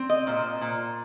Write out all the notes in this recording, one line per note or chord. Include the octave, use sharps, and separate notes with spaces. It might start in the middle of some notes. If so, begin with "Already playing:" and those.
Already playing: C4
D#5
A#2 C5
A#2